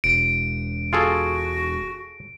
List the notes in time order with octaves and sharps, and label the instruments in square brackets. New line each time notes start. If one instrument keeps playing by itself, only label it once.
[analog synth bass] E1 [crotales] D7
[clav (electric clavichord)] F4 G#4 A4 [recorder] F#4